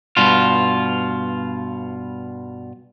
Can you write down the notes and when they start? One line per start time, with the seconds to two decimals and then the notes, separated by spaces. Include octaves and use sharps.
0.17 G2 B2 F4